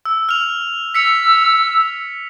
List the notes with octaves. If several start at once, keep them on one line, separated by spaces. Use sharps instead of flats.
E6
F6 F7
E6 B6 C#7 F7